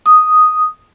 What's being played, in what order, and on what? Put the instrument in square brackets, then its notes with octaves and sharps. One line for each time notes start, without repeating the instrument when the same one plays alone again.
[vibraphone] D#6